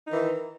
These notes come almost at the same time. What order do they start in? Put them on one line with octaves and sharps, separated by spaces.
D#4 D#3 E3